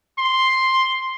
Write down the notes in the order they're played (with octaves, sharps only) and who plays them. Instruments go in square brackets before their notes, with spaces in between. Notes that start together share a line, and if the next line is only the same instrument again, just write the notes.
[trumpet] C6